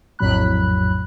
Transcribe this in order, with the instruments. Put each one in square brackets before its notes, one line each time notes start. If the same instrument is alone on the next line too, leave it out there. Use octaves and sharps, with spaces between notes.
[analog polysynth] A#1 F2 A2 F#3 B5 F#6